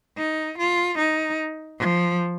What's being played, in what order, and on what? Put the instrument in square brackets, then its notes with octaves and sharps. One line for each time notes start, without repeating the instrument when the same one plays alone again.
[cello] D#4
F4
D#4
F3